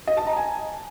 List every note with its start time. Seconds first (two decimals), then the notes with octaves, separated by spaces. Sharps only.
0.07 D#5
0.17 A5
0.27 A#5
0.36 G#5